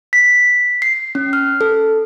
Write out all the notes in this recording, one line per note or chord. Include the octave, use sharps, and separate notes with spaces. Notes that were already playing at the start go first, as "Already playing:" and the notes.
B6
C7
C#4
F6
A4